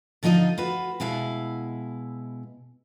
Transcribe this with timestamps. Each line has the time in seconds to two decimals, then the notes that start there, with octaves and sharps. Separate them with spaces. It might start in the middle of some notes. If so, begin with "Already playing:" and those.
0.23 D3 F3 D#4 F4 D#5
0.58 F4 F#4 B4
1.00 B2 G#3 E4 F5